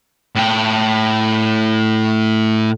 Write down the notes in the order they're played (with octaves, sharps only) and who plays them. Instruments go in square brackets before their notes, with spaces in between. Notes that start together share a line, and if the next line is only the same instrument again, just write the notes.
[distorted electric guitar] A2 G5